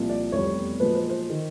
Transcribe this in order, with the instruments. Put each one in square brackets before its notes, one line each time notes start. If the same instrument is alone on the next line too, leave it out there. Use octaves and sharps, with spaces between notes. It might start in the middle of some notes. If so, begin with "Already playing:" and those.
Already playing: [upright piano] C2 A#2 F3
D5
F1 E2 B2 G3 C#5
B1 A#2 F3 G#3 B4
C5
C5
D#3